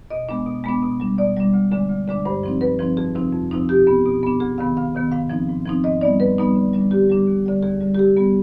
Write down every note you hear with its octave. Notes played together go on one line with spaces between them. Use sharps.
B2 D#5
G#3 B3 D4
B2
G#3 B3 D4
B2
G3 D4
B2 D5
G3 D4
D2
D3 G#3 D4
D2
D3 G#3 D4
G2 C5
F3 C4 D#4
G2 B4
F3 C4 D#4
F2 G#4
C3 F3 C4 D#4
F2
C3 F3 C4 D#4
B2 G4
B3 D4
B2
B3 D4
D2 G#4
C3 D#3 B3 F5
D2 F5
C3 D#3 B3
G#2 F5
F3 C4 D#4
G#2
F3 C4 D#4
G#2 D#5
G3 B3 D#4 D5
G#2 B4
G3 B3 D#4
D3
G3 D4
D3 G4
G3 D4
D#2
D3 G3
D#2 G#4
D3 G3
G4
C3 G#4
G3 B3